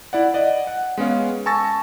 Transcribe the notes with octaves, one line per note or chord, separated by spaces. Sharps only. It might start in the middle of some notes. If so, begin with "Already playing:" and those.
E4 D5 F#5
D5 D#5 F#5
F#5
G#3 B3 C#4 F5
G#5 A5 C#6 E6 A6 A#6